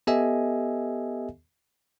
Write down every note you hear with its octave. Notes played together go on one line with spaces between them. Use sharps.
B3 G4 A4 D#5 E5 G#5